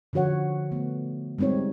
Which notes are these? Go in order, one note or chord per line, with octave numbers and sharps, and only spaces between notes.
D3 F3 F#4 C#5 F#5
A3 B3
G3 G#3 C4 D#4 C#5